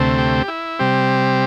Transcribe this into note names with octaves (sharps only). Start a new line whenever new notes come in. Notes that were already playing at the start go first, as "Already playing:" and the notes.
Already playing: D2 C3 A3 C4
G4
E4
C3 G3 C4 G4